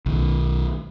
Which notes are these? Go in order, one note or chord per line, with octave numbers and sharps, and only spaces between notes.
B1 D#3